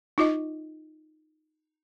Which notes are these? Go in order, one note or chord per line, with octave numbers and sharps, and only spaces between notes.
D#4 F4 D#5